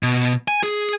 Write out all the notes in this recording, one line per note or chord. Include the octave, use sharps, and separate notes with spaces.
B2
G#5
G#4